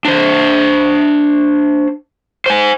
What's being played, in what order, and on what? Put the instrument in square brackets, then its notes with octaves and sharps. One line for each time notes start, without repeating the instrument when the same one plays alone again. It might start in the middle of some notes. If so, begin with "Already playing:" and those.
[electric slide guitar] D4 C5
C5 G#5